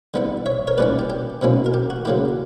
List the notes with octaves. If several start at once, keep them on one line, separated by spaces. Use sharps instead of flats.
D3 G3 B3 E4
C#5 E5
A#4 C#5
A#2 G3 C#4 E4 B4 D5
G4
G4
B2 F#3 A#3 C#4 E4
A#4
G4
F#4
C#3 F#3 A#3 E4 G4